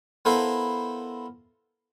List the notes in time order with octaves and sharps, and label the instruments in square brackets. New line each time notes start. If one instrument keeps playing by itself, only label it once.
[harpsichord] B3 E4 A4 A#4 C5 F5